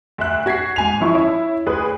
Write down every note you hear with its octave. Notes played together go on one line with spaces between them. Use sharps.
D2 E5 F#6
F#4 G#6 B6 C7
G#2 G#5 F7
G1 F3 E4 C#6
C#4 E4
D2 G#4 B4